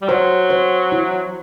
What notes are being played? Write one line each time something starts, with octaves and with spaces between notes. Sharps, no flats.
G3
F#3 C5
C5
E4